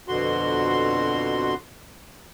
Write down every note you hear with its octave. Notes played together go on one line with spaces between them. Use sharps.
F2 B2 D3 F#4 C6